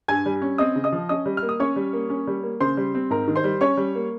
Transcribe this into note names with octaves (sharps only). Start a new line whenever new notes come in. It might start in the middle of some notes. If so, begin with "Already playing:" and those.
G2 G#5 G#6
G3
C#4
C4 D#5 D#6
C#3
D#5 D#6
F3
C#4 D#5 D#6
G3
F6
A#3
D#6
C#4 C#5 C#6
G3
A#3
C#4
G3
A#3
C#3 C5 C6
G3
C4
G#2 A#4 A#5
D#3
C5 C6
G3
C#4 C#5 C#6
G3
A#3